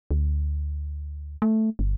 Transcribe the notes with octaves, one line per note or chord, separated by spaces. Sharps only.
D2
A3
G1